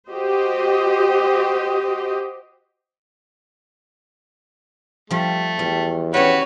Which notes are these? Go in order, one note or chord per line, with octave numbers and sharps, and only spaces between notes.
F#4 G4 C5 D#5
F3 G3 A3
E2 G3
C#4 F#4 B4 C#5 G5